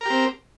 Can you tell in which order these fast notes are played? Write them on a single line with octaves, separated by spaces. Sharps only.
A#4 G4 C4